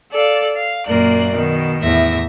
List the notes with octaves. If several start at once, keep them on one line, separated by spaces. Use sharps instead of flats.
A4 D5 F5
F5
F#2 A#2 A#3 A#4 D5 F#6
B2 D#3
E2 A2 E5 A#6